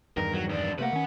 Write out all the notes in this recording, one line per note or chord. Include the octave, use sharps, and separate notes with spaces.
E2 G2 D#3 A#4
F#3
F2 D4
C3 A3 A#3 B4 F#5
D#3 C#4